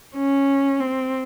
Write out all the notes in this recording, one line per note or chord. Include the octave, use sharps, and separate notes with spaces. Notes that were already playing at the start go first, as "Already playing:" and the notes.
C#4
C4